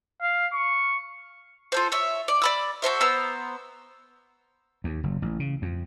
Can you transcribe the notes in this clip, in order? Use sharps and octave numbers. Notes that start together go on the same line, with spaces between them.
F5
C#6
F4 A4 C5
C#5 E5
D5
D5 B5 E6
F#4 A4 C5 E5
B3 C5 A#5 E6
D#2
F#1
A1
C#3
F2